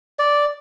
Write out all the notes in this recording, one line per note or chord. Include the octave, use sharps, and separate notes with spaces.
D5